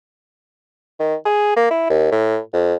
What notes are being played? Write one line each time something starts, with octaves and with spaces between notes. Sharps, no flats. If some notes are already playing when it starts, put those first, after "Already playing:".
D#3
G#4
A#3
E4
D#2
A2
F2